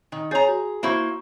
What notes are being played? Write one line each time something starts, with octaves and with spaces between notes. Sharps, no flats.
D#3
G#4 C#5 A#5 G6 A6
F#4
A#3 E4 F#4 C5 E5 C#6